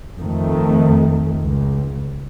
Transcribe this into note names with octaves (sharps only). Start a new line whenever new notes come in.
F2 D#3 A3
C#2